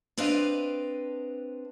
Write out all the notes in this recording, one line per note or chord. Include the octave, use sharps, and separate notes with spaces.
C4 D4 B4 C5 D#5 F5